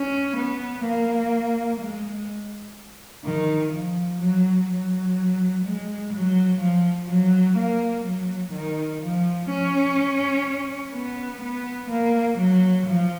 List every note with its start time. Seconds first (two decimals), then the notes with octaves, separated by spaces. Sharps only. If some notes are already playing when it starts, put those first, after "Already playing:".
Already playing: C#4
0.36 B3
0.84 A#3
1.80 G#3
3.24 D#3
3.72 F3
4.21 F#3
4.69 F#3
5.64 G#3
6.13 F#3
6.61 F3
7.09 F#3
7.57 A#3
8.05 F#3
8.53 D#3
9.02 F3
9.50 C#4
10.93 B3
11.42 B3
11.89 A#3
12.38 F#3
12.86 F3